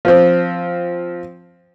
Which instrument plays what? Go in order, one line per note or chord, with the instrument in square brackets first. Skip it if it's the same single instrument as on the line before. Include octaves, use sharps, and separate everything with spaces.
[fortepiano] F3 C4